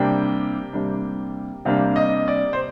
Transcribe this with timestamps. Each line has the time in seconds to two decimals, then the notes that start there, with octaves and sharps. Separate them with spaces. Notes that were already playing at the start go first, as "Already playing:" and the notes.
Already playing: C3 G3 A#3 D4 G5
0.73 C3 G3 A#3 D4
1.65 C3 G3 A#3 D4 F5
1.96 D#5
2.28 D5
2.53 C5